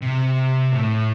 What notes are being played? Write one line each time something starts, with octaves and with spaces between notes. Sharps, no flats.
C3
A2